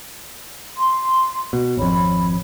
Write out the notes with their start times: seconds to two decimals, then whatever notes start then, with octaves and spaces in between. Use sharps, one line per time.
0.77 C6
1.53 B2
1.77 G#1 F2 C#5 B5